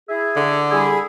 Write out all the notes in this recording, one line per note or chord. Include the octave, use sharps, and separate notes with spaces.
E4 G#4 E5
D3
G3 E4 G#4